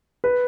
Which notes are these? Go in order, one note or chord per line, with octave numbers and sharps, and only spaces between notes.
B4